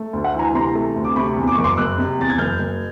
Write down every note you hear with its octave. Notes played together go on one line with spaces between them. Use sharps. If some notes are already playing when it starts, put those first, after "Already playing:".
Already playing: A3
D2
E5 F#5
E3 G#5 A#5
C3 A#5 C6
A3
D2
D6
C3 B5 C#6
E2
D6
F#1 C#6
C6 D6
F#1 E6 F#6
C3
E2 A6
G#6
F#1 F6 G6
F#1